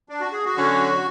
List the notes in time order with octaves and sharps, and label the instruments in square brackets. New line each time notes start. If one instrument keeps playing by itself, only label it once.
[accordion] D4
F#4
G#4
F#4
[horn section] D3 F#3 C#4